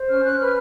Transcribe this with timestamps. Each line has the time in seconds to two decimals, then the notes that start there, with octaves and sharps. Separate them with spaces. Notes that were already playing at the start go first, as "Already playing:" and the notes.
Already playing: C5
0.09 C#4 F6
0.24 C#4 F#6
0.39 B4 F6